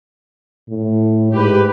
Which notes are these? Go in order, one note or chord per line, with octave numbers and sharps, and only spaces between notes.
A2
G#2 G4 B4